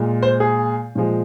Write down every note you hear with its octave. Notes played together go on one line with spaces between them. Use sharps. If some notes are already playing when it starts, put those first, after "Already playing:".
Already playing: A#2 G#3
C5
G#4
A#2 F3 G#3